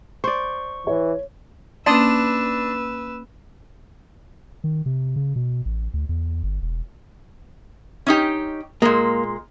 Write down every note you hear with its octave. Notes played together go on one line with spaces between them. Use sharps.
C5 D5 C#6
E3 C#5
A#3 C#4 D4 B4 A5 C6 D#6 E6
D#3
C3
C#3
B2
A1
D2
E2
G1
E1
C#4 D#4 G4
A#2 G#3 A#3